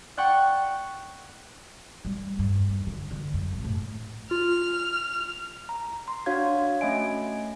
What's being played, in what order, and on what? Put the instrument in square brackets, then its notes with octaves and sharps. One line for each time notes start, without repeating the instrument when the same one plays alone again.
[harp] D5 F#5 G5 C#6
[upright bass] G3
G2
D#2
D3
D3
F#2
G#1
A2
[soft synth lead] F4 [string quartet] F6
[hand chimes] A#5
C6
D4 F#4 C#5 F5 G#6
A3 C#4 D#5 E5 G#5 D7